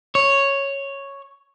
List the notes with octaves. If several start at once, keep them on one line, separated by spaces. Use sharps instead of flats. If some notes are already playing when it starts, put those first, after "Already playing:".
C#5